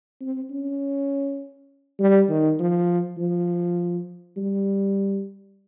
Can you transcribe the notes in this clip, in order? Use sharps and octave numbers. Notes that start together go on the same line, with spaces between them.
C4
C#4
G3
D#3
F3
F3
G3